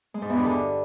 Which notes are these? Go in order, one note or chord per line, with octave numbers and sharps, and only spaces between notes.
G#3
G#2
E2
G2
D3